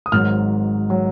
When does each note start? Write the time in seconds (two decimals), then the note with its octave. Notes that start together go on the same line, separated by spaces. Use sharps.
0.06 D#6
0.12 G#1 G#2 F#3 F6
0.90 F#3